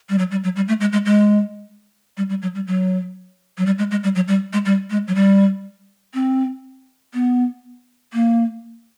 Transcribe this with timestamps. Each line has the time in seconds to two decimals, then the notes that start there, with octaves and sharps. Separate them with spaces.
0.09 G3
0.18 F#3
0.31 G3
0.44 F#3
0.56 G3
0.68 A3
0.80 G#3
0.93 G#3
1.06 G#3
2.17 G3
2.29 G3
2.42 F#3
2.55 G3
2.67 F#3
3.58 F#3
3.66 G3
3.78 G#3
3.91 G#3
4.04 G3
4.15 F#3
4.28 G3
4.53 G#3
4.65 G3
4.90 G#3
5.08 F#3
5.15 G3
6.14 C4
7.14 B3
8.13 A#3